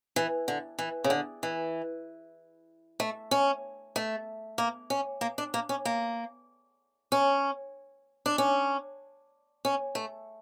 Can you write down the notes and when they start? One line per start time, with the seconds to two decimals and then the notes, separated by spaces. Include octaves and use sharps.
0.16 E3
0.48 D3
0.79 E3
1.04 C#3
1.10 D3
1.43 E3
3.00 A3
3.31 C#4
3.96 A3
4.58 A#3
4.90 C#4
5.21 A#3
5.38 D4
5.54 A#3
5.69 C#4
5.85 A#3
7.12 C#4
8.26 D4
8.38 C#4
9.65 C#4
9.95 A3